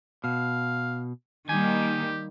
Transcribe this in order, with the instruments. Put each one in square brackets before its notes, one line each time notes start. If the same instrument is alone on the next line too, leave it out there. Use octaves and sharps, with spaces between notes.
[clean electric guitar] B2 [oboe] F5
[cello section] D#3 G3 A#3 [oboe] G4 [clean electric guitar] G#5